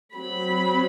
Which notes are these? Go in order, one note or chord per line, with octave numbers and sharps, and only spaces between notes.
F#3 C4 B5